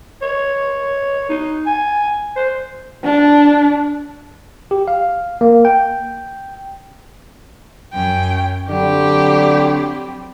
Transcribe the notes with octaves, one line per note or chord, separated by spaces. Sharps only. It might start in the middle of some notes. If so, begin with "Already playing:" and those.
C#5
D#4
G#5
C5
D4
G4
F5
A#3
G5
F#2 C#4 G5
D3 F#3 G3 C4 G4